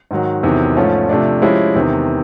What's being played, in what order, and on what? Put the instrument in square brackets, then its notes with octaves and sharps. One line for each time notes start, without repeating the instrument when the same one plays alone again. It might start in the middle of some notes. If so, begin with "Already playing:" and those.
[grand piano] G#2 D#3 F#3
E2 C3 D#3 F#3
G#2 F3 A3 C#4
C3 F3 A3 D4
F3 G#3 C#4 E4 G4
E2 C3 D#3